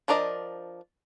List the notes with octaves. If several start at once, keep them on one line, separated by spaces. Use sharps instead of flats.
F3 D4 A#4 D5 D#5